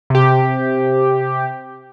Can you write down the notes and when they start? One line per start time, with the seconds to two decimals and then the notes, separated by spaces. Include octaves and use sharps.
0.10 C3 G4